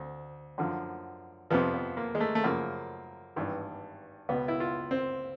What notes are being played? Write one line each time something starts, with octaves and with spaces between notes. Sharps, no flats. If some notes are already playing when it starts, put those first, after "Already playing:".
Already playing: D2 C4
F#2 D3 F3
F2 C3 F3 B3
B3
A#3
G#3
A3
A3
F#2 C#3 F3 A#3
G#1 G2 E3
C#2 B2 B3
E4
F4
C4